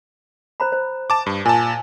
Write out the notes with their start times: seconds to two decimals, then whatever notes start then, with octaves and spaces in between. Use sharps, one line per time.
0.60 C5 A#5 B5
0.72 C5
1.10 A5 D6
1.26 G2
1.45 A#2 G#5 A5